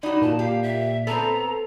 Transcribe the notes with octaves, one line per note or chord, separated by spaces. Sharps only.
D#4 F#4 D5 B5
A#2 A5
G4 F5
E5
B3 C4 A4 A#5